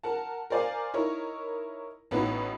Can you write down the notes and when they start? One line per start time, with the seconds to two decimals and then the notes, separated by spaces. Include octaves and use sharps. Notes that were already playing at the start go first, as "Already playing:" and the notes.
0.03 A#4 F#5 A5
0.50 A#4 C5 D5 F5 G#5
0.94 D#4 E4 A#4 C#5
2.11 A1 A2 B3 D#4 F#4 B4